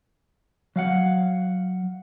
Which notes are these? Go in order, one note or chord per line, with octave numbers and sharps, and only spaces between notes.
F#3 F5 F#5